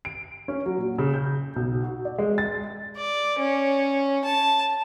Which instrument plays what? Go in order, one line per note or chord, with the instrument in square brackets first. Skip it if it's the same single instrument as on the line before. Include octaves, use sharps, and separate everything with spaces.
[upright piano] D7
C#4
F#3
A#2
C#3
G6
B1
F#4
D5
G#3
A6
[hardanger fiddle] D5
C#4
A5